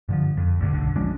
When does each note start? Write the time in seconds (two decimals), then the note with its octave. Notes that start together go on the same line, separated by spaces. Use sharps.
0.09 G2 D3 F3
0.37 F2
0.59 E1 D2 G2 D3
0.74 B1 D3
0.96 F3 G#3 C#4 D4